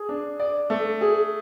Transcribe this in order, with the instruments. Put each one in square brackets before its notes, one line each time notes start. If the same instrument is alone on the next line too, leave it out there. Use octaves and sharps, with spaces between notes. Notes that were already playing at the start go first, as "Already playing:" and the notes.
Already playing: [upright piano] G#4
D4
D5
A3
G#4